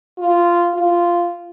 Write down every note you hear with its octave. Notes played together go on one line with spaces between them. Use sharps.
F4
F4